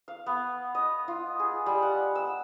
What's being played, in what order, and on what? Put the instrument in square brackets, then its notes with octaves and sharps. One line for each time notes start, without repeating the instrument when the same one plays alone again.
[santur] F5
B3
D#5
F4
G#4
G3
F#5
E6